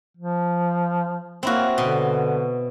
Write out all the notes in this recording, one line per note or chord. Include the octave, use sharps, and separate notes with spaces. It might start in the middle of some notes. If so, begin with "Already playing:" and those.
F3
A#3 C4 E4 F#4
B2 D3